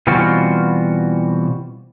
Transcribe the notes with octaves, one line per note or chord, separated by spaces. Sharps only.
B2 E3 G3 C4 F4 F#4